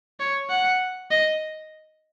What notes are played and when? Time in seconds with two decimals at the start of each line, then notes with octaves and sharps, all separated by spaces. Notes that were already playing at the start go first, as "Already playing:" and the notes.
0.20 C#5
0.49 F#5
1.11 D#5